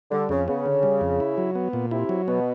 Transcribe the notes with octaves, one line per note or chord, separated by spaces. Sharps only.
D3 G3
F2 C#3
C#3 B3
D3
G3
F2
E4
F#3
B3
A#2
C3 E4
F#3
B2 B3